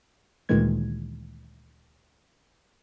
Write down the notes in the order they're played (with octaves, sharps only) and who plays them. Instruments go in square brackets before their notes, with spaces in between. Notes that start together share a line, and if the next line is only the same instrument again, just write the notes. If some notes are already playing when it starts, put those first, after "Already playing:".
[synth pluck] D2 A#2 D#3 E3 G#3 G#6